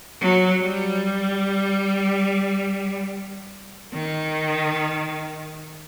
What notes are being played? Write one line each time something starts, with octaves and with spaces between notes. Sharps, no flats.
F#3
G3
D#3